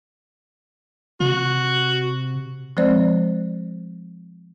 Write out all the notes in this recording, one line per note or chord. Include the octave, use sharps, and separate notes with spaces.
C3 F#4
F3 G#3 C4 C5 D5